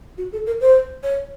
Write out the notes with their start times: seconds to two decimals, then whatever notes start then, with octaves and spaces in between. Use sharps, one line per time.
0.18 F#4
0.33 A4
0.47 A#4
0.61 C5
1.03 C#5